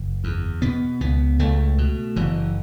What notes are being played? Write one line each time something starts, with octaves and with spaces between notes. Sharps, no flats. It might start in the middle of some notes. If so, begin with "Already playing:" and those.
Already playing: F#1
E2
B2 B3
C#2 B3
C#2 A3
B2
F#1 E3